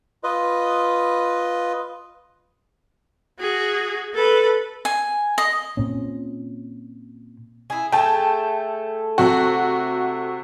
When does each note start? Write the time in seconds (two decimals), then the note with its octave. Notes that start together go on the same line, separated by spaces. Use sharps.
0.24 F4 B4 D#5
3.40 F#4 G#4
4.15 A4 B4
4.85 G#5
5.38 D#5
5.77 A#2 C4 C#4
7.70 E4 G#4
7.92 A3 G#4 G5 A5
9.18 C3 F#4